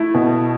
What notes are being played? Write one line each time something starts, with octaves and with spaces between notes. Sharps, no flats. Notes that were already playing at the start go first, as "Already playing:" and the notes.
Already playing: A3 E4
B2